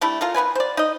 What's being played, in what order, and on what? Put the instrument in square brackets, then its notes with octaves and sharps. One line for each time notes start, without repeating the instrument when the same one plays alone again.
[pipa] G3 A3 D4 E4
F4 A4 A#4
D#3 B3 B4 G#5
C5 D5
D#4 D#5